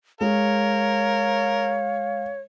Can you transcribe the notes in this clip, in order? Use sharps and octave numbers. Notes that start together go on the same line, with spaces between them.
G#3 A#4 C#5 F5